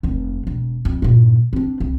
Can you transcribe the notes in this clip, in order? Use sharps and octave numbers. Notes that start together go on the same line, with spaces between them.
F1 D#2
E1
F2
G2 A#2
C4 D4
C2